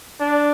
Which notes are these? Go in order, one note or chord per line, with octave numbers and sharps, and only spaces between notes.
D4